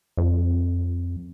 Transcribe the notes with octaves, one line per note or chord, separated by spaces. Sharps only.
F2